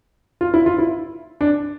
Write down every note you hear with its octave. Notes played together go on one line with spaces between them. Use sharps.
F4
E4
F4
E4
D4